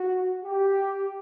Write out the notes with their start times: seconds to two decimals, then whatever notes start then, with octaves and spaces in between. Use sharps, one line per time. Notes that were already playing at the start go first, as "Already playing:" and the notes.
Already playing: F#4
0.45 G4